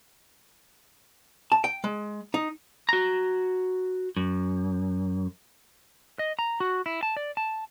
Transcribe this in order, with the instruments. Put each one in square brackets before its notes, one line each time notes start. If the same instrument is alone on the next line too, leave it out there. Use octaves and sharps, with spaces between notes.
[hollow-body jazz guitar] A5
G5
G#3
D#4
[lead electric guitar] F#4 A#5
F#2
[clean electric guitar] D#5
A#5
F#4
E4
A5
D5
A5